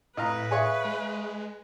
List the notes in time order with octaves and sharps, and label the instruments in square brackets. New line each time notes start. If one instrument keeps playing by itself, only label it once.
[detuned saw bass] A2 [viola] B4 [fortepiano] D#5 F5 A#5
[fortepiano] G#4 C#5 [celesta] E5 F5 G#5
[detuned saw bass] G#3